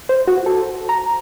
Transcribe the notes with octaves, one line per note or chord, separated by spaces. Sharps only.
C5
F#4
A4
A#5